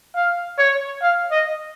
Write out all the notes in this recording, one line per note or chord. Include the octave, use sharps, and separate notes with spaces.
F5
C#5
F5
D#5